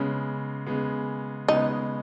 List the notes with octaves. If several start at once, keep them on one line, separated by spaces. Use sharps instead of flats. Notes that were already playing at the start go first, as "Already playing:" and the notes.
Already playing: C#3 G#3 B3 C#4
C#3 G#3 B3
C#3 G#3 B3 D#4